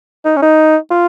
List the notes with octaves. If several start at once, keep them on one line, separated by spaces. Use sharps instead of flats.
D#4
C#4
D#4
F4